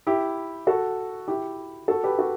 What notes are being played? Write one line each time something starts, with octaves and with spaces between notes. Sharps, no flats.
E4 G4
F#4 A4
E4 G4
F#4 A4
G4 B4
F#4 A4